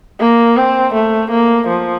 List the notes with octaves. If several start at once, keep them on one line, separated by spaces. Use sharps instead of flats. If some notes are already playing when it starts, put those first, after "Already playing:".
A#3
C4
A3
A#3
F3